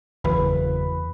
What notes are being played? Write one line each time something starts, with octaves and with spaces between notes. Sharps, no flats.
F#1 E2 B4